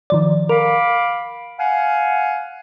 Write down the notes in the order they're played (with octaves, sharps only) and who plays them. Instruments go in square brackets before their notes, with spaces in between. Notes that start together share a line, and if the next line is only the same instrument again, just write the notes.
[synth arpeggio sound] D#3 F3 D5
[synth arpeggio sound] A#4 [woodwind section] F5 B5 D6
[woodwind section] F5 F#5 G#5